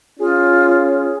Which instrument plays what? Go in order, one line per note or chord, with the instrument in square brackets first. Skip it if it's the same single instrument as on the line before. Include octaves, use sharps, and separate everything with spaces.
[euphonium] C#4 [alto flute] F4 [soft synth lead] G#4